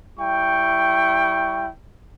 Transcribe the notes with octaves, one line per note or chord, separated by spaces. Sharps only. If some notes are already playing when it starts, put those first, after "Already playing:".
G3 E4 G5 C#6